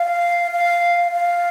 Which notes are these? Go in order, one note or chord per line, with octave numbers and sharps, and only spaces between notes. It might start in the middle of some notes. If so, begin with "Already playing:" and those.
Already playing: F5
F5
F5